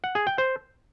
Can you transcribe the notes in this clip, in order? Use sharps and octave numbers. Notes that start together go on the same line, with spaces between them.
F#5
G#4
G5
C5